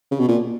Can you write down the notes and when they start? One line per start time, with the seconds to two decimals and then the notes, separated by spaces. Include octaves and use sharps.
0.11 C#3
0.20 B2
0.28 A#2